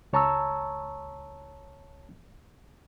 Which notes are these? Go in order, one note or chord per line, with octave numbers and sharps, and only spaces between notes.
C#2 C#5 A5 A#5 C#6 E6